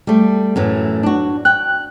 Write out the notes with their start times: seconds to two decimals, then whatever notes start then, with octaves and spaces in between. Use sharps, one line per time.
0.07 G3 A3
0.56 F#2 A2 E3
1.03 D4 F#4
1.45 G5 F#6